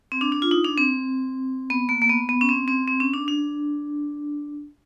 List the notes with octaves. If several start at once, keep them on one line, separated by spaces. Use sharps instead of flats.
C4
D4
D4
F4
D#4
D4
C4
B3
A#3
A#3
B3
B3
C#4
C4
C4
C4
C#4
D4
D4